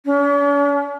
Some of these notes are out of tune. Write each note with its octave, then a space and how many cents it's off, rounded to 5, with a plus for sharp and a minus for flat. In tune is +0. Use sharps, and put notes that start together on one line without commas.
C#4 +45